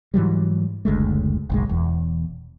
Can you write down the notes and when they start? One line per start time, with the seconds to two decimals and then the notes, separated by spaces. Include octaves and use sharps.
0.14 G#2 E3 F#3 G3
0.85 F#1 D2 G#3 A3
1.50 F#1 B1 G#3
1.69 E1 E2